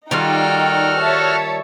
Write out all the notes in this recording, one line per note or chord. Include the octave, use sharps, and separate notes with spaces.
D#3 G3 D#4 F4 F#4 A4 G5 F6
C#5 E5 A5